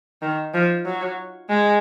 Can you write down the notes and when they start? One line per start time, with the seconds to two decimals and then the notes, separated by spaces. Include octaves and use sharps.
0.22 D#3
0.54 F3
0.86 F#3
1.49 G#3